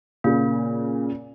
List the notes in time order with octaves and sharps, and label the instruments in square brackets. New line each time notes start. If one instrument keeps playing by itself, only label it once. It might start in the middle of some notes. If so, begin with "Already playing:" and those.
[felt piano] A#2 C#3 [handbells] A#3